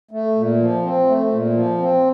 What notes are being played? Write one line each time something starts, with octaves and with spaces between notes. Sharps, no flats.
A3
A#2
F3
C4
A3
A#2
F3
C4